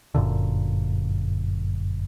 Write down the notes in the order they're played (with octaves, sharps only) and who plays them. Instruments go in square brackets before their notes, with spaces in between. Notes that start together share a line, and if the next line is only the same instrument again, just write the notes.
[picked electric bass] G1 F#2 A#2 D3